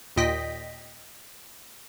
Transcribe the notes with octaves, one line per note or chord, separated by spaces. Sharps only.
D#2 A#2 D#5 G5 B6